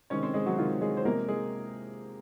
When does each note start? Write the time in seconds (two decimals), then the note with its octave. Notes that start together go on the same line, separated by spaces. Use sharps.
0.10 C3 D#3 G#3 C4 C#4 C#5
0.23 C4 C5
0.34 G#3 G#4
0.46 F#3 F#4
0.58 C3 D#3 G#3 C4 F4
0.81 G#3 G#4
0.97 C5
1.05 C3 F3 G#3 A#3 A#4
1.28 G#3 G#4